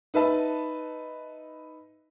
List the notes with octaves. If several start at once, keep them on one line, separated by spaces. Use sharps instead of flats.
D#4 B4 E5 A5